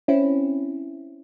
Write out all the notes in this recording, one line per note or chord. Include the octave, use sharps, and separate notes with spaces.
C4 C#4 E4